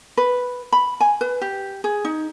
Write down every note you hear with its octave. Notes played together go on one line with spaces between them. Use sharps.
B4
B5
G#5
B4
G4
G#4
D#4